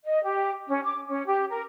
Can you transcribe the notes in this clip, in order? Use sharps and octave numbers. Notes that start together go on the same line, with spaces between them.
D#5
G4
C#4
D6
C#4
G4
A#4